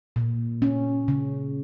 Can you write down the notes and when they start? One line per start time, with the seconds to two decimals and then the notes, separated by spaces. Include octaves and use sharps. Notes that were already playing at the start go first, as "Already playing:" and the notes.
0.16 A#2
0.62 C#4
1.08 C#3